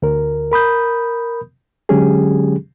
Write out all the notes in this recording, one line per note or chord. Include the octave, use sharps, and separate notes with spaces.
D2 A#4
A#4 B5 D#6 G6
D3 F#3 G#3 C#4 G4 G#4